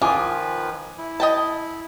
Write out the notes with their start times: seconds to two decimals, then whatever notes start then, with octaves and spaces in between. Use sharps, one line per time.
0.02 D#3 F3 F4 B4 G#5 D6 D#6
0.98 E4
1.20 D#5 G5 A5